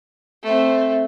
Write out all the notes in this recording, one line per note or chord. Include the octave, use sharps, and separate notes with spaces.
A3 C4